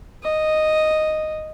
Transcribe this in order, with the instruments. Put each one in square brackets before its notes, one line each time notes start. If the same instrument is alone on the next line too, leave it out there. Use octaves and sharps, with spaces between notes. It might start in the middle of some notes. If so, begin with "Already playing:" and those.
[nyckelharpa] D#5